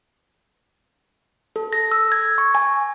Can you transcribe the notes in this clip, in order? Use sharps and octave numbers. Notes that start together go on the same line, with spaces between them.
A4
A#6
E6
G#6
C#6
G#5